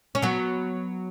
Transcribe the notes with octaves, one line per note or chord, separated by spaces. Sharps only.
C#4
F#3 B3